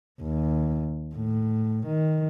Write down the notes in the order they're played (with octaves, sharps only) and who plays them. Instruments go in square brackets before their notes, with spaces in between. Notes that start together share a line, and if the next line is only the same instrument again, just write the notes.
[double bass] D#2
A2
D#3